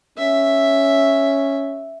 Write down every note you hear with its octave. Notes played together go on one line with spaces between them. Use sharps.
C#4 E5